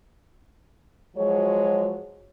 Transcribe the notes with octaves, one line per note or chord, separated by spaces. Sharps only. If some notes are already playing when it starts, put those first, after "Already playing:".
F3 F#3 G#3 F#4 C#5